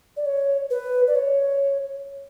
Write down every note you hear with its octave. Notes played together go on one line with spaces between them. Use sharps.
D5
C#5
B4
D5
C#5